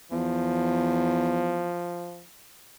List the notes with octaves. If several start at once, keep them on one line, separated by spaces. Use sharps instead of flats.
E2 F3